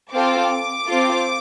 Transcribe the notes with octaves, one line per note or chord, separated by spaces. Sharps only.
C4 F4 A4 D6
C4 F4 A4